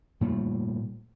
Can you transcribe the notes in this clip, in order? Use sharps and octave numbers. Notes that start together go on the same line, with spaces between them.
A#2 G3 A3